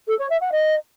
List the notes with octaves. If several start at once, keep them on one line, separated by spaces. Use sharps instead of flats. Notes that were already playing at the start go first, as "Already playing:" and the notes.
A4
C#5
E5
F#5
D#5